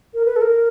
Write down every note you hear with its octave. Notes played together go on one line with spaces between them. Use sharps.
A#4
B4
A4
A#4